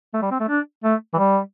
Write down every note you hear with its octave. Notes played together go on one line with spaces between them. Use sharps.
A3
G3
C4
A3
D4
A3
E3
G3